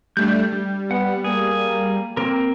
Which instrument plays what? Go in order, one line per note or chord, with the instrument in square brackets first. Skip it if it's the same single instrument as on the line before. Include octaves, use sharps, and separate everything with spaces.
[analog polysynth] G3 A3 D4 [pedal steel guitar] G6
[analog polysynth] G3
[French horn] B3 [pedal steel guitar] F#5
[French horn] A#3 [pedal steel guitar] G#4
[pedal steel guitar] A#3 C4 A#4